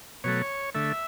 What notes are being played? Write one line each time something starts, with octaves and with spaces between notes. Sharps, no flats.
B2 F#3 A3 C#5
D3 A3 E5